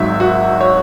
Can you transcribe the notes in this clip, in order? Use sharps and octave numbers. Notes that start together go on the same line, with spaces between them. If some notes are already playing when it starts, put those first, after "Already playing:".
Already playing: G#1 G#2 F#3 E5
F#4
C#5